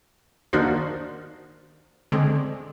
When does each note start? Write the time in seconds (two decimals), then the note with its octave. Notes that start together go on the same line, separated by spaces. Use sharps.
0.53 D#3 A#3 D4 D#4 F#4 C5
2.12 D3 G#3 C4